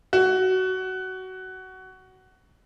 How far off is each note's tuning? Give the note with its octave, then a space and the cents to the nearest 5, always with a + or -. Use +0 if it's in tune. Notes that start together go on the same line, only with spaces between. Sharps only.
F#4 +15